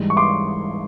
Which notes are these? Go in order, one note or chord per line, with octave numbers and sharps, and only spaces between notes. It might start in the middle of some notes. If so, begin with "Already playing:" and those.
Already playing: G#2 E3 G3
C#6
C6 D6